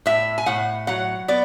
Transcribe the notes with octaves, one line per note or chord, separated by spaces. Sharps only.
A2 E5
G#5
A2 F#5
F#3 F#5
B3 D5